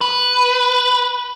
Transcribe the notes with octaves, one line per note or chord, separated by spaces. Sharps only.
B4